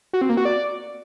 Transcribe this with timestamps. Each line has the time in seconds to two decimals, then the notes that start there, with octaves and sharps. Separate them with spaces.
0.13 F#4
0.21 C4
0.29 A#3
0.37 F#4
0.45 D5